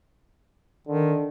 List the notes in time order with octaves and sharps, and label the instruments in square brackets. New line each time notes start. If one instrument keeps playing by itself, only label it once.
[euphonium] D3 [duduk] D#3